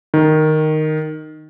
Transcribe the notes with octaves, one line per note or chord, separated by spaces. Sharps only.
D#3